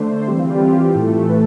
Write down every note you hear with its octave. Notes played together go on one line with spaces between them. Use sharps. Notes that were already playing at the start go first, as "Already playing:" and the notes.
Already playing: D3 A3 D4 C5
E3 G3 C4 G4
F4
G4
A2 E3 A3 A4
B4